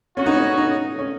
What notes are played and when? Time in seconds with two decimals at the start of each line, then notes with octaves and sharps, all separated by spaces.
0.17 B3 C#4 F#4 C#5
0.26 D#4
0.36 C#4
0.57 D#4
0.99 C#4